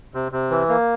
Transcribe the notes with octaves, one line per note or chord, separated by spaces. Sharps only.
C3
C3
E3
A#3